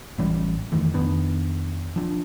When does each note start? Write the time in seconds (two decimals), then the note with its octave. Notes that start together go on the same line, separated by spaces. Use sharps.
0.18 A1 E3 G3 C#4
0.72 F2 D#3 E3 A3
0.94 F2 D#3 B3 D4
1.96 F3 D4